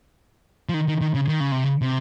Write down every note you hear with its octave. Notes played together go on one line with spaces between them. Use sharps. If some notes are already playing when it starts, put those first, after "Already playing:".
F3
D#3
D#3
D#3
C#3
D#3
C#3
C3
C#3
C3